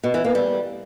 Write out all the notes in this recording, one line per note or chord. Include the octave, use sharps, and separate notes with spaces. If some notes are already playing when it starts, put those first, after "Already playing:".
B2
E3
A#3
G3